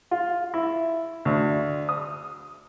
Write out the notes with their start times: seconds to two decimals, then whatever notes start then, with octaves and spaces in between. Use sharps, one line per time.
0.11 F4
0.54 E4
1.25 D2
1.89 D#6